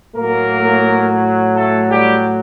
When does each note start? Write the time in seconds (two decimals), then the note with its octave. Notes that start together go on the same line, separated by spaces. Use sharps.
0.16 A2 F#3 A#3 A#4
1.55 A3 A4
1.90 G3 G4